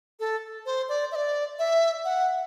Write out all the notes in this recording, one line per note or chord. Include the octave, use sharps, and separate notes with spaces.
A4
C5
D5
E5
D5
E5
F#5